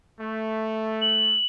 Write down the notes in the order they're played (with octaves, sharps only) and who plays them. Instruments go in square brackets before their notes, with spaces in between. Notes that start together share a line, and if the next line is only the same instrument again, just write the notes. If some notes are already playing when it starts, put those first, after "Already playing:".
[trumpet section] A3
[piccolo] F#7